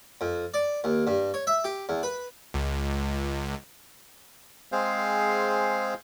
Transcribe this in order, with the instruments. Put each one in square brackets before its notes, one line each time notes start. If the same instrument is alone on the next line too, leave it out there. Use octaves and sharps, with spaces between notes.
[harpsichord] F2
D5
D#2
G2
C#5
E5
G4
E2
B4
[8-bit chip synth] C#2
[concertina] G#3 C4 G#4 C5 F5